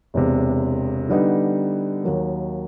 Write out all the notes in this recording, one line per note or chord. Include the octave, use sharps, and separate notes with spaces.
E1 E2 C3
D3 G3 B3 D#4
D#2 D#3 F#3 A#3